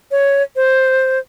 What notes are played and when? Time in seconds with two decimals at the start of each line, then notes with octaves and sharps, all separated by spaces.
0.11 C#5
0.56 C5